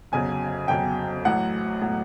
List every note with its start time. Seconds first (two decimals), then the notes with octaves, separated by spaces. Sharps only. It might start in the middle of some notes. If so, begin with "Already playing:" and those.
0.12 G1 F2 C#3 F#3 G#5
0.68 G1 F2 C#3 F#3 G5
1.25 A1 A2 F#3 F#5
1.82 A2 F#3